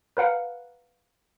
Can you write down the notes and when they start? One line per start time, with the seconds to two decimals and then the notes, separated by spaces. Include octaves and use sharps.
0.17 A#4 B4 F5 F#5